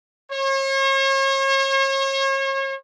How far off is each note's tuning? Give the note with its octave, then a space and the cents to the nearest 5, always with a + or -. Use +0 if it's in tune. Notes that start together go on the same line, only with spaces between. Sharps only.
C#5 -40